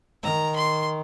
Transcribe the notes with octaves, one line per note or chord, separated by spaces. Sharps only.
D#3 A#5
C6